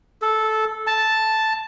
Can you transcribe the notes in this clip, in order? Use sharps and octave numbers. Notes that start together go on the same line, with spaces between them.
A4
A5